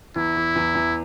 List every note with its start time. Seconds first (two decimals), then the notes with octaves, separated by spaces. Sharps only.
0.16 E2 E4
0.37 E2
0.56 E2
0.75 E2